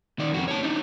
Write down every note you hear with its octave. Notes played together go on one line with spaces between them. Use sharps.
D#3 D5
F2 F#4
C#5 A5
D4 D#4